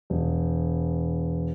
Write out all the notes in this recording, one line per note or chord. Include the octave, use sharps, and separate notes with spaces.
E1